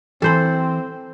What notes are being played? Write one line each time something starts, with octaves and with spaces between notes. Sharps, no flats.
E3 C4 A4 C5 B5